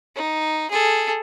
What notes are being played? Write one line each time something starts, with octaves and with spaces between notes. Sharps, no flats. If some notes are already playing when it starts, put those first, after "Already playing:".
D#4
G#4 A4